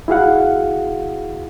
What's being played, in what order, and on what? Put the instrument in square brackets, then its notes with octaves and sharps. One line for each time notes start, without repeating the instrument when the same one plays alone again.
[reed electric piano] E4 F#4 G#4 F5 F#5